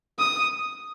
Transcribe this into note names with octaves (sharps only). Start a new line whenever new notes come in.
D#6